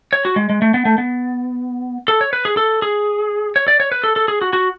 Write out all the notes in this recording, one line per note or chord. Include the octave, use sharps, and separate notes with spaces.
C#5
F#4
G#3
G#3
A3
B3
A3
B3
A4
C#5
B4
G#4
A4
G#4
C#5
D5
C#5
B4
A4
A4
G#4
F#4
F#4